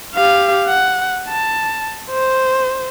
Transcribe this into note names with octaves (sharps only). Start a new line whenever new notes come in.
G4 F5
F#5
A5
C5